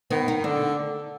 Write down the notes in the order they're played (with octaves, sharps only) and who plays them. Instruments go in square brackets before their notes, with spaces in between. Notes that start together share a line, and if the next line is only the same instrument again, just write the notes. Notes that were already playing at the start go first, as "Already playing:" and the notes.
[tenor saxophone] D#3 [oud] B3
[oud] D#4
[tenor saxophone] D3 [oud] D4